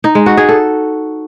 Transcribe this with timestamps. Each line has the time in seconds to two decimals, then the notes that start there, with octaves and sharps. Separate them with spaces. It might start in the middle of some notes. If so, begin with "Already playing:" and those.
0.04 D#4
0.15 G#3
0.26 F#4
0.37 G#4
0.49 A4